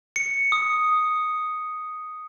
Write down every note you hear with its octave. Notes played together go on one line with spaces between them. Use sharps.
C#7
D#6